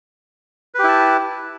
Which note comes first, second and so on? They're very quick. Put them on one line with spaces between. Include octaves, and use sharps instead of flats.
B4 G4 E4 A5